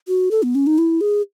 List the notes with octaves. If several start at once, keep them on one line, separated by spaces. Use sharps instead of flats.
F#4
A4
B3
C#4
D#4
E4
G#4